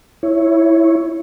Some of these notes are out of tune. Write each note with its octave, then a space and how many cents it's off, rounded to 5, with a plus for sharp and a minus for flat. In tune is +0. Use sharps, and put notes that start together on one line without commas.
E4 +0 C#5 +0